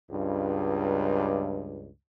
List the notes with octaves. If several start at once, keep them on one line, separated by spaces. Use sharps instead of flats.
C#2 G2